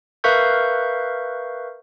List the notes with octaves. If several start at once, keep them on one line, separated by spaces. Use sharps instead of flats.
A#4 B4 E5 F5 C#6 G6